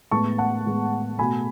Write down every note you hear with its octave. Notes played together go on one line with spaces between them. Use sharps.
A2 G#3 B3 A5 C#6
F#5 A5
A2 G#3 B3
B2 A3 G#5 B5